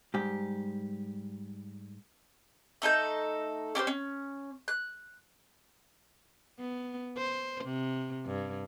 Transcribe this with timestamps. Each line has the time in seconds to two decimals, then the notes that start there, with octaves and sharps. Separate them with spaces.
0.14 G#2 G3 G4
2.82 A3 D#4 A4 G6
3.75 C#4 G4 A#4 C5
3.87 C#4
4.68 F#6
6.59 B3
7.17 C5
7.64 C3
8.26 G2